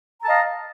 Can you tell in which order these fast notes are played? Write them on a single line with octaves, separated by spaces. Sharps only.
A#5 A5 D#5 F5